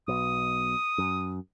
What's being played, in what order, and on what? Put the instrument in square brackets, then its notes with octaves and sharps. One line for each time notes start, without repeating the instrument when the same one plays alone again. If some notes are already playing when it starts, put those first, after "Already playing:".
[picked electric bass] B1 B2 [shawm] D#6
[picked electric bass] F#2